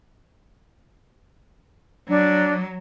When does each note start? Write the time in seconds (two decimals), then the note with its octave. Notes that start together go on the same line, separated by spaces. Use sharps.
2.09 F#3 D4